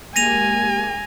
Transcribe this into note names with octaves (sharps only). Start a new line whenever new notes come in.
G#3 A#3 G4 G#5 A#6 D#7 F7